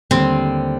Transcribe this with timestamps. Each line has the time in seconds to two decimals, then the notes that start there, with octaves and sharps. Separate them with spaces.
0.11 D#2 D3 G3 C4